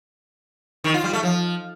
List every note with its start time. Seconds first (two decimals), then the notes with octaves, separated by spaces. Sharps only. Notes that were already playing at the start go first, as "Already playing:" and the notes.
0.84 D#3
0.94 F4
1.04 G3
1.13 A3
1.23 F3